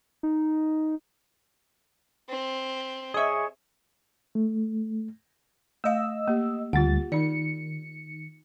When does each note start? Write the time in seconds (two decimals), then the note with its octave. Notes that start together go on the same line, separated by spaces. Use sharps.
0.23 D#4
2.28 C4
3.14 G#4 C#5 D#5 E5
4.35 A3
5.84 A3 D#5 F5 E6
6.28 A#3 G4
6.73 D2 G3 F4 G4 F#5 A6
7.12 D#3 D#4 D5 C#7